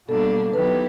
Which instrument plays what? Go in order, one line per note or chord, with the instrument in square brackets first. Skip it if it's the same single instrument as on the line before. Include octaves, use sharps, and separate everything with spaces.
[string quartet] B2 G3 A#3 D4 [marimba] A4
[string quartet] D#3 F#3 B3 E4 G4 [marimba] B4